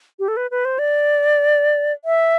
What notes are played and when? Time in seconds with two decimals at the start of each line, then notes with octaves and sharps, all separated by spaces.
0.19 G4
0.28 A4
0.37 B4
0.51 B4
0.65 C5
0.79 D5
2.05 E5